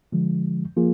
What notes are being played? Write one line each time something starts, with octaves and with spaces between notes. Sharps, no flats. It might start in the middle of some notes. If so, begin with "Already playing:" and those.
D3 F3 G#3
F3 A#3 F4 G#4